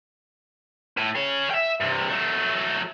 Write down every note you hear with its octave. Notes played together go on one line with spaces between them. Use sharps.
A2
G#4 C#5
E5 G5
G2 C3
F#3 A3